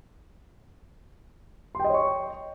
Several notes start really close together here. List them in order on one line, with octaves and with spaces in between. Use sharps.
C6 G5 D#5 C#5 C#6